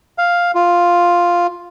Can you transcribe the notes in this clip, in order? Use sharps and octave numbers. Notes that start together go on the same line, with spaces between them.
F5
F4